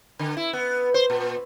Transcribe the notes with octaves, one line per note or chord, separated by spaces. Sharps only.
D3
E4
B3
C5
A#2